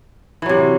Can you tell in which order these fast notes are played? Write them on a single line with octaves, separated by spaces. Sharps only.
E3 F#3 C3